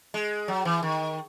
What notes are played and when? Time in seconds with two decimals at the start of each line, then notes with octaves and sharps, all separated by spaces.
0.14 G#3
0.48 F#3
0.65 E3
0.83 D#3